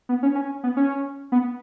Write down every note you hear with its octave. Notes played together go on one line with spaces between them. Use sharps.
B3
C#4
C#4
B3
C#4
B3